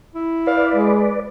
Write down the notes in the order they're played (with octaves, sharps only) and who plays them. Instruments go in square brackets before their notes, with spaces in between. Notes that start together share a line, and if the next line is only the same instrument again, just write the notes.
[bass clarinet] E4
[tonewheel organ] B4 D5 [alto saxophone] F5
[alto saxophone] G#3